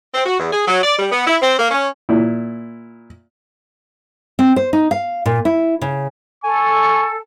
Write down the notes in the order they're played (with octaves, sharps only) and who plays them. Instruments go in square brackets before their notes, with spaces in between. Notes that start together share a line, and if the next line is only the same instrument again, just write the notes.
[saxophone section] C4
F#4
E2
G#4
F#3
D5
G3
B3
E4
C4
A#3
C#4
[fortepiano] A#2 E4
[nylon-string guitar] C4
C5
D#4
F5
A#2
E4
C#3
[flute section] A4 [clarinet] G#5 [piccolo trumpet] C#6